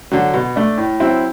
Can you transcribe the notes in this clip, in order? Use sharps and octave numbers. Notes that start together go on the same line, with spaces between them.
D3 F#3
B2
A3 D4
A2
F#3 C4 E4